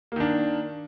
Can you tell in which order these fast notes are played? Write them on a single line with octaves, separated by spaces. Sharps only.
A#3 D#3 D4